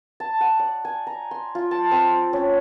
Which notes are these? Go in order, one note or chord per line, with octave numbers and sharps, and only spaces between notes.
A5
F#5
D5
G#5
A#5
C6
F4
A5
C4
C#4